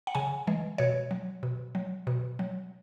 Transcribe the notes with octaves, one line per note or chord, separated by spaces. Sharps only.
F#5
C#3 G#5
E3 G#3
B2 C#5
F#3
B2
F#3
B2
F#3